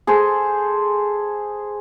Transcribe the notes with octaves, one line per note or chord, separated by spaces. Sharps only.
G#4 A4 C5